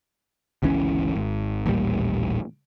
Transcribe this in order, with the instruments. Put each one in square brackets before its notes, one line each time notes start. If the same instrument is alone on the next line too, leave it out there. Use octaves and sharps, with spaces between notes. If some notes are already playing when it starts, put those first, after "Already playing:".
[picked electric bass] G1 C#2 E3 C#4
G#1
A1 D#2 A#2 G3